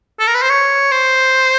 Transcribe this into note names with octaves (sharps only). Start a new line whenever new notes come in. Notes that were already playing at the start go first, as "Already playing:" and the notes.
A4
A#4
B4
C5
C#5
C5